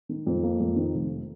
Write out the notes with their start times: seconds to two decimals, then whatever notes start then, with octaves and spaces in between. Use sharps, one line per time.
0.09 D#3
0.27 F2
0.43 A#3
0.60 F2
0.76 D#3
0.94 F1